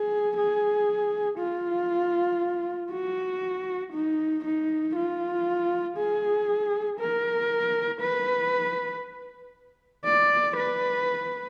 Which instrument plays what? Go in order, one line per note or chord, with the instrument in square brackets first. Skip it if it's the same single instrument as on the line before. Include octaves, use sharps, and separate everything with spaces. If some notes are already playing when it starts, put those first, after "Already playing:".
Already playing: [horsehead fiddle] G#4
G#4
F4
F#4
D#4
D#4
F4
G#4
A#4
B4
D5
B4